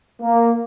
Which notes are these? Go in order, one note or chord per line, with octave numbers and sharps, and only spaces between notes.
A#3